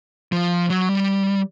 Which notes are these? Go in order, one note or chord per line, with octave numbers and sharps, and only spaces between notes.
F3
F#3
G3